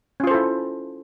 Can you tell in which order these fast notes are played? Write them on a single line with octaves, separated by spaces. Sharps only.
C#4 F4 C5 A4 E4